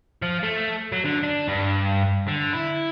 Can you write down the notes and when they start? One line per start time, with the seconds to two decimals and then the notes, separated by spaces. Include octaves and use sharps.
0.22 F3
0.43 A3
0.92 F#3
1.05 D3
1.24 D4
1.48 G2
2.28 D3
2.53 E4